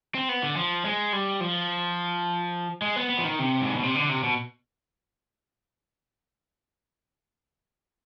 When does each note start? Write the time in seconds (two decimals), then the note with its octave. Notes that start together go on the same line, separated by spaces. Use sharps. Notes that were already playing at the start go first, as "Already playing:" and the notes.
0.15 C4
0.29 B3
0.43 D3
0.57 F3
0.85 G#3
1.13 G3
1.40 F3
2.82 G#3
2.96 B3
3.10 B3
3.19 F3
3.24 D#3
3.39 C3
3.62 G#2
3.72 B2
3.83 C3
3.95 D3
4.09 C3
4.23 B2